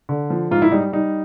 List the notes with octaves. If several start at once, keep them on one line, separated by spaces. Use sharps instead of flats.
D3
F3
G#2 F4
E4
G3 D#4
G3 D#4